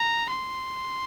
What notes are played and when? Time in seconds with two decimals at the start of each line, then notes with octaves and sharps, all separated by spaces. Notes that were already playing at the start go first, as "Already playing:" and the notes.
Already playing: A#5
0.30 C6